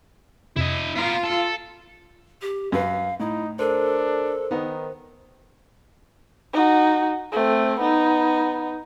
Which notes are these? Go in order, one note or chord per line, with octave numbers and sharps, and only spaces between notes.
F2 C3 E4 D#5
B3 F4 A#4
A4
G4
F#2 B4 F5
A2 D#4 E4
D4 A4 A#4 C5
D#3 B3 D#4
D#4 F#4
A3 C4
B3 D#4